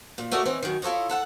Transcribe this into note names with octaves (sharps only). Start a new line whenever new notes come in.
A#2
A3 F#4 A#4 D5 D#5 A5
E3 C4 C#4 D#4
F#2 D#3
E4 F4 A4 C#5 D#5
A4 F#5 A5